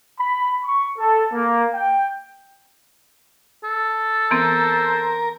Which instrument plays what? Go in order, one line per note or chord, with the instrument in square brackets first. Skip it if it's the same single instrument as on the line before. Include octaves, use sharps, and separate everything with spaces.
[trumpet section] B5
C#6
A4
A#3
G5
[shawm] A4
[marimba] E3 B3 C4 [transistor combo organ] A#4 [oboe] C5